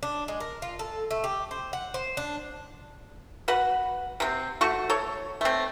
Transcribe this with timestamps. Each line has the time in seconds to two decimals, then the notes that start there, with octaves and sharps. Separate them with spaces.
0.03 D4
0.28 G#3
0.40 A#4
0.62 F4
0.79 A4
1.11 A3
1.24 G4
1.51 C5
1.73 F#5
1.94 C5
2.17 D4
3.48 F#4 B4 F#5
4.20 C3 C4
4.61 A3 F#4 C#6
4.90 A4 C#5
5.41 A3 C4